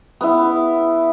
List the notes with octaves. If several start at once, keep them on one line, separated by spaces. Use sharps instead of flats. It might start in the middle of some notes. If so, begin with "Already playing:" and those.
B3 E4